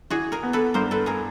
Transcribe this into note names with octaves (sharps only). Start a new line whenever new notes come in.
E3 F#4 G#4
G#4 A#4
B3
A4 B4
G2 A#4 C5
A4 B4
G#4 A#4